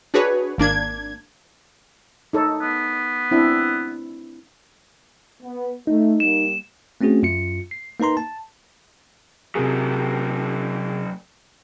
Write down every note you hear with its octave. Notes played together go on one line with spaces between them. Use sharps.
D4 F#4 G#4 B4 C#5
G#1 A#3 D4 G#6
D#4 A4 C#5
B3
C4 D4 E4
B3
A3 D#4
G3 A#3 E7
A3 C4 C#4 F#4 G#4
F#2 F4 C#7
C7
A#3 D#4 B4 A#5 C6
A5
C3 F#3 A#3 G#4